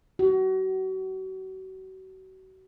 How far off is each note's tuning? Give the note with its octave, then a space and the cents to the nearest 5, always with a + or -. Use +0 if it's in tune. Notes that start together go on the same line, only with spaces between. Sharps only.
F#4 +35